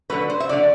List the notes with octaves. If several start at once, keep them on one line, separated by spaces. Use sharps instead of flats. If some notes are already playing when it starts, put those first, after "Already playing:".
D3 F#3 A3 B4
C5
E5
D3 F#3 A3 D5